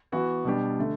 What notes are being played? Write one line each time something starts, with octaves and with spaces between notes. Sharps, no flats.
E3 B3 F#4
B2 G3 D4 G4
D3 A3